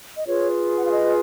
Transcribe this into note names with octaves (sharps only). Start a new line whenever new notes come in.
D#5
F4 G#4 B4 C#5
F#5
F5
D#5